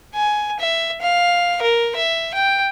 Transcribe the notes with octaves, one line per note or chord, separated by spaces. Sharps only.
G#5
E5
F5
A#4
E5
G5